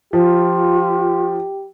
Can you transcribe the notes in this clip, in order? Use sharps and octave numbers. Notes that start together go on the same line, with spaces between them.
F3 F4 G4